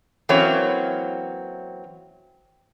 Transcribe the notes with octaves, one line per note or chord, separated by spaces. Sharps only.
E3 F#3 A#3 C4 C#4 C#5